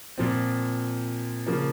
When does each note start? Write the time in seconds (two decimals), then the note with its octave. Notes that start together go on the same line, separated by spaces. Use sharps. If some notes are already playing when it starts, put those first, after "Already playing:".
0.18 A#2 F3 C4
1.47 C#3 F3 A#3